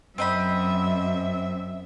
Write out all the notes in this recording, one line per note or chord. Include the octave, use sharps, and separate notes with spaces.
F#2 C4 D#5 E5 B5